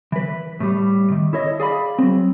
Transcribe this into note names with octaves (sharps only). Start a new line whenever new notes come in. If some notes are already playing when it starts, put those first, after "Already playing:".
E3 B4
A2 G3
D#3
E4 A4 C#5 D#5
G#4 D5 F5 B5
F#3 C4